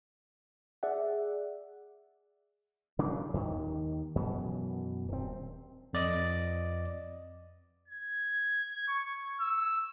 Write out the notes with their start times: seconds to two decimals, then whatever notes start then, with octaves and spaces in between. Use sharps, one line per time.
0.83 G#4 D5 E5 F#5
2.99 C#3 F#3 A#3 D4
3.34 D#2 D#3
4.15 F#2 B2 E3
5.08 D#1 C4
5.93 F2 D5 D#5
7.88 G#6
8.88 C#6
9.40 E6